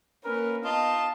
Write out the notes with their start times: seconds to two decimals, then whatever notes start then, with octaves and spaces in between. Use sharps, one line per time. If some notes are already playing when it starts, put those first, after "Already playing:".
0.25 A#3 C#4 A#4 B4
0.65 B3 D#4 F4 D#5 A5